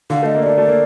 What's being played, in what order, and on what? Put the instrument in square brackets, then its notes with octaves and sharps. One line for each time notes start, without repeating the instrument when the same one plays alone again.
[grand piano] D3 [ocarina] F5
[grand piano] A3 [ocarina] D#5
[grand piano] A#3
[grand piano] A3 [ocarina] D5
[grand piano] A3
A#3